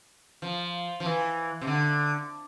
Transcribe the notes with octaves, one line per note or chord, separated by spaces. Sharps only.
F3
F3
E3
C3
D3